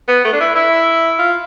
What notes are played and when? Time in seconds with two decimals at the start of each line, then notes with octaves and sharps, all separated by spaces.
0.08 B3
0.25 A3
0.33 D4
0.40 E4
0.55 E4
1.19 F4